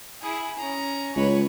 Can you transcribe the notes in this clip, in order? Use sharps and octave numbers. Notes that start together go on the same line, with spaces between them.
E4 G#4
C#4 A#5
C#2 B4 C#5